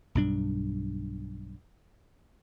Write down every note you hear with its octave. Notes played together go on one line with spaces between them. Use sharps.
B1 G2 D4